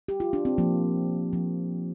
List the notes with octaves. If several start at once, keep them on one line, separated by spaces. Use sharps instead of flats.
G4
F4
D4
C4
F3 A#3
F3